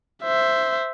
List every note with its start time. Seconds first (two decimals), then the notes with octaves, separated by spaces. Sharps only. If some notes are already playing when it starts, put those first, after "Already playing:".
0.23 C5 E5